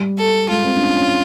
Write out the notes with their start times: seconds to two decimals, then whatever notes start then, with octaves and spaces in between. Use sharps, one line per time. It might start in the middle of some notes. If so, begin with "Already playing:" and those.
Already playing: G3
0.18 A4
0.49 G#3 F4
0.64 C4
0.76 D4
0.81 C#4
0.97 C#4